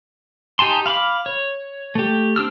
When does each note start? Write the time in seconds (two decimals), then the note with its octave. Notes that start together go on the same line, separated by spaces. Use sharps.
0.59 D#4 G4 G#5 A5 C6
0.86 F5 B5 C#6 D6
1.26 C#5
1.95 A3 G4
2.36 C4 D4 E6 F6